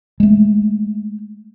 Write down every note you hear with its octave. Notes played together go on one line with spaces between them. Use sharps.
G#3 A3